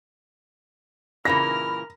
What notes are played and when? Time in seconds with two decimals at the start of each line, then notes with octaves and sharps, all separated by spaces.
1.25 A#2 C#3 E3 A#4 B5 F6 A#6